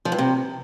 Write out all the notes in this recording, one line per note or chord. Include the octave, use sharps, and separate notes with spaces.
F3
G2
C3